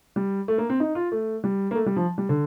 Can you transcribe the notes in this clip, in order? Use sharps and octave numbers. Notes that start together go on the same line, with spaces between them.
G3
A3
A#3
C4
D#4
F4
A3
G3
A#3
A3
G3
F3
G3
D3